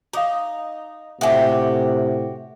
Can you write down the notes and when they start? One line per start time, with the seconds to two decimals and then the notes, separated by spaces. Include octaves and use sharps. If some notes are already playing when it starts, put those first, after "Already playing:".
0.13 D#4 G#4 F5
1.21 A2 C3 F#4 G4 A4 E5 G#5